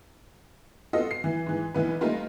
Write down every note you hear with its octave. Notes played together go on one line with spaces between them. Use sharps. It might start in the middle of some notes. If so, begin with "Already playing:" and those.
B3 F4 F#4 A4 D#5
C7
E3
G#2 E3
B1 E3 B3 B4
G3 A3 A#3 D#4 F4 B4